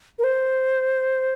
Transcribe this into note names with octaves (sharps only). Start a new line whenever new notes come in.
A#4
C5